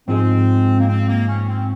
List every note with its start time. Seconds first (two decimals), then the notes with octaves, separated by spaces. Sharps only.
0.08 G#2 F3 G#3 C4 D#4 G#4
0.79 A#3
0.88 C4
1.08 A#3
1.28 C#4
1.48 C4